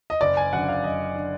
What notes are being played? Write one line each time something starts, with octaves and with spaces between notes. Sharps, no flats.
D#5
F#1 D5
G#5
F#2 D3 F#5
F5
F#1 D#5
D3